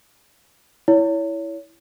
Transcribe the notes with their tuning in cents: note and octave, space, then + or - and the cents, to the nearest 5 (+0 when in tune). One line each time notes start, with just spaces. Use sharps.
E4 +0 C#5 +25